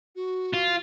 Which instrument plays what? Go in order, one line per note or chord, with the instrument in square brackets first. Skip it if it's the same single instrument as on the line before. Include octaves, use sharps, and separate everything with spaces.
[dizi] F#4
[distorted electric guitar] F4